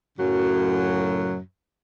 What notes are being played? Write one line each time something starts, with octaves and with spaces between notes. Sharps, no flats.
F#2 A2 C#3 F#3